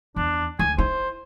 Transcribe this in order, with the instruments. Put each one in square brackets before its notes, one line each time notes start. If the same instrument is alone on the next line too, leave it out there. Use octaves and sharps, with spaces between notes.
[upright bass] E2 [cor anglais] D4
[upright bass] D2 [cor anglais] G#5
[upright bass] E4 [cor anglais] C5